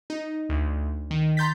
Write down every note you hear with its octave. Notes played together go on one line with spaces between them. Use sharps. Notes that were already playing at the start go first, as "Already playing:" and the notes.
D#4
D2
D#3
A#5 C6 G6 A6 B6